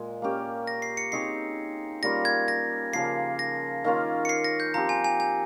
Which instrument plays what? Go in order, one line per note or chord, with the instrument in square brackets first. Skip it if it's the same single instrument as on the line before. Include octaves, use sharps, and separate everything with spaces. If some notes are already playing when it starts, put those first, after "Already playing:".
Already playing: [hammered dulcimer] A#2 G#3
A#3 C#4 G4
[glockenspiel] A#6
C7
C#7
[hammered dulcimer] C4 D#4 G#4 C#5 [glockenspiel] C7
[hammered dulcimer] G3 A#3 C#4 F4 [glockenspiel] A#6
[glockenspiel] G#6
A#6
[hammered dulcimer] C#3 F3 A#3 [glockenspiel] C7
[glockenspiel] A#6
[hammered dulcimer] D#3 A#3 C#4 F4
[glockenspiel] C#7
C7
A#6
G6
[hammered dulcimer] F3 C4 G4 [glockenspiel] A#5
[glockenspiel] G#5
G#5
G#5